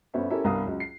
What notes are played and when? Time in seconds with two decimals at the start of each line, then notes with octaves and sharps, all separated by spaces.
0.14 G1 B3 C#4 C5 E5
0.30 C#4 E4 G4 A4 A#4 E5
0.44 C2 G2 B3 F5 A#5 D#6
0.65 C#2 F#3
0.80 C7